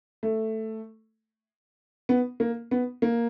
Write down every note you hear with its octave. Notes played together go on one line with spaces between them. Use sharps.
A3
B3
A#3
B3
A#3